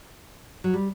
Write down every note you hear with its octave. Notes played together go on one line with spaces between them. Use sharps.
F#3
G3